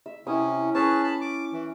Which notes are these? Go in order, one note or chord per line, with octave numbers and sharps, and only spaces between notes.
E5
C3 C#4 E4 D#6
C#4 G#4 B4 A5
A5 B5
D6
E3